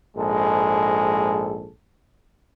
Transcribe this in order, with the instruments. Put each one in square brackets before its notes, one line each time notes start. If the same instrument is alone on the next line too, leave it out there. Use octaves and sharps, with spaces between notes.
[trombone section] A#1 G#2 G#3 A4